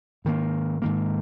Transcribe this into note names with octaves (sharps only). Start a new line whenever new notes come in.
G#2 D#3 A#3
G#2 D#3 A#3